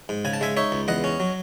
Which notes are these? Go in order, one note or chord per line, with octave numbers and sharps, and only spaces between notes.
G#2
C#3 G#5
A5
G#3 E5 G#5
D#4 C#5 E5
C#2
E2 D#5 F#5
C#4
F#3